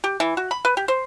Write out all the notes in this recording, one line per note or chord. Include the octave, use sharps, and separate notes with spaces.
G4
E3
F#4
B5
B4
G4
C5